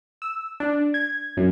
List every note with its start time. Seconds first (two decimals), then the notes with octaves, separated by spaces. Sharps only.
0.22 E6
0.60 D4
0.94 G#6
1.37 F#2